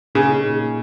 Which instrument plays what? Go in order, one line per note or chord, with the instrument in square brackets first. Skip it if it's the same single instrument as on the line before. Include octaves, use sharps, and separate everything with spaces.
[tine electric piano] A#2 [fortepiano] C#3
[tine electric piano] D#4
A#2
A#2